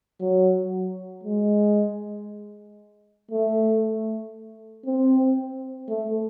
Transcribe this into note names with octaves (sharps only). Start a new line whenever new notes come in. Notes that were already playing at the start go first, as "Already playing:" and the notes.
F#3
G#3
A3
C4
A3